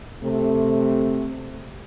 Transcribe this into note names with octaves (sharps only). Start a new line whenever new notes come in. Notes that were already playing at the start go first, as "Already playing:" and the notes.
C3 A3